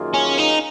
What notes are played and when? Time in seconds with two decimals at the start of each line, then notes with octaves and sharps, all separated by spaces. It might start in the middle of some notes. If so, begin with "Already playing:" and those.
Already playing: F#2 D#3 A#3 F4 G#4
0.14 C#4
0.38 D#4